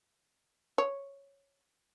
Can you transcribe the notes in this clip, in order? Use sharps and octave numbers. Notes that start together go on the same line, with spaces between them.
C#5